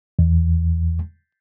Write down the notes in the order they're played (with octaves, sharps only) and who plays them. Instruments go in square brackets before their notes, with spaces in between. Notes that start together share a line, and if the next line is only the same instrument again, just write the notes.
[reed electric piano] E2